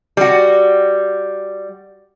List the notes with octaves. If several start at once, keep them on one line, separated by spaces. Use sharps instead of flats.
G3 F#4